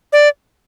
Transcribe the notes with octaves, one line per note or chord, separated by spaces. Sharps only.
D5